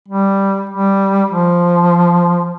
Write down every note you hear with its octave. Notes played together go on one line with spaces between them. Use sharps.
G3
G3
F3